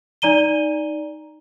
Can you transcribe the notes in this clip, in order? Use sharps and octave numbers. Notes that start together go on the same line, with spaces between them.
D#4 D5 A#5 D#7 G7